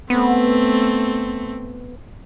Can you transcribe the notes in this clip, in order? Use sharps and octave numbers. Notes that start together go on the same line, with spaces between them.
A3 B3 C4